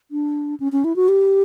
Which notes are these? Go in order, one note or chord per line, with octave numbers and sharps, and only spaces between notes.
D4
C#4
C#4
E4
F#4
G4